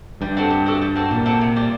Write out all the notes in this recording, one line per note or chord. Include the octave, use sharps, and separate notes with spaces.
G2 G3
C4 F#4 A4
G3
C4 F#4 A4
G3
C4 F#4 A4
A#2 G3
C4 F#4 A4
C3
G3 C4